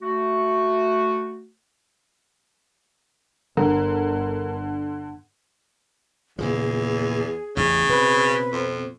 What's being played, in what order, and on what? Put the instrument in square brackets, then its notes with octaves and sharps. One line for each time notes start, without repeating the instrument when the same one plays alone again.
[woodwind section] A3 F#4
[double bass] G1 [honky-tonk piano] D3 [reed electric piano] A#4
[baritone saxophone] E2 [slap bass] A#2 C#3 F3 [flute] G#4
[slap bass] A1 E2 [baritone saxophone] C#3
[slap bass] B2 C4 [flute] B4
[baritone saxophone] F2